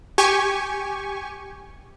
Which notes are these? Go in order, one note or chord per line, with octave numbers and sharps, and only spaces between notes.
G4 G#5 C#6